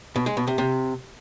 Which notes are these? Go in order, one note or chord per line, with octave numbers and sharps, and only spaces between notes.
B2
G#3
B2
C3
C3